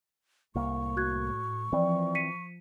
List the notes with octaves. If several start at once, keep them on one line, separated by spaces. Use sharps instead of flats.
C2 A2 A#3 C#6
F#4 F#6 G#6
E3 F3 C4 D5
B6 C#7 D#7